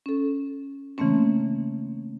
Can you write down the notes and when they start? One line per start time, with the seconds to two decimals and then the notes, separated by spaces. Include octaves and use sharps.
0.06 C#4 A4
0.98 C#3 E3 A3 A#3 C4 C#4